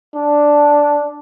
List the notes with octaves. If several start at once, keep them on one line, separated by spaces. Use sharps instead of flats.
D4